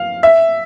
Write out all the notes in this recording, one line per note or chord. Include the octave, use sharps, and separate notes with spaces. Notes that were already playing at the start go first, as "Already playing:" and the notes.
Already playing: F5
E5